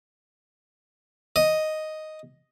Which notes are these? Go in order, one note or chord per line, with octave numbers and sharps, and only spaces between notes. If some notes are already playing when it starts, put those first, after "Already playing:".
D#5